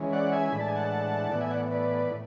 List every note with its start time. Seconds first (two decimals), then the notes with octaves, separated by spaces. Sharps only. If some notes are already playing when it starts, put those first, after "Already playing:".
Already playing: E3 G#3 C#4
0.12 D5 F#5
0.32 E5 G#5
0.52 A2 E3 G#3 D4 B5
0.60 A5
0.68 G#5
0.76 F#5 A5
1.31 A2 E3 B3 D5 F#5
1.41 E5 G#5
1.51 D5 F#5
1.71 B4 D5
2.10 A2